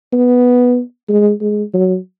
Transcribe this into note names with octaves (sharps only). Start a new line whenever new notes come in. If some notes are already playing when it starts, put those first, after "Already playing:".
B3
G#3
G#3
F#3